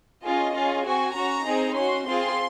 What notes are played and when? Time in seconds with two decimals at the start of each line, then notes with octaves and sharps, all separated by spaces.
0.23 C#4 F4 G#4 D#5
0.54 C#4 F4 G#4
0.84 C4 F#4 G#5
1.15 C#4 F#4 A#5
1.45 C4 D#4 G#4
1.76 C#4 F#4 C6
2.06 C4 F4 G#4 C6